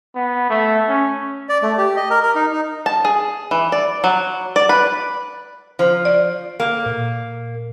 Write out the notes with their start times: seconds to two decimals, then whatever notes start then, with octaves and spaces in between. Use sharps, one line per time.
0.15 B3
0.50 A3
0.89 C#4
1.49 D5
1.63 A3
1.78 G4
1.97 D#5
2.10 A#4
2.23 A#4
2.35 D#4
2.52 D#4
2.86 A5
3.05 G#4
3.51 E3
3.72 D5
4.04 F#3
4.56 D5
4.69 B4
5.79 F3 C5
6.05 D5
6.60 A#3
6.86 A#2